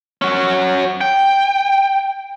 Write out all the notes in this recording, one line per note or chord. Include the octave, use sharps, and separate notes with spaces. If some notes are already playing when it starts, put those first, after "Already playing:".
C#4 F#4
G5